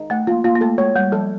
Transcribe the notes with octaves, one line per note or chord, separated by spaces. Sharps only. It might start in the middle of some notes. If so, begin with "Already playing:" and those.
Already playing: D#4
A3 F#5
A#3 F4
A#3 F4
A#3
A3 A4
G#3 C#5
G3 F#5
F3 A4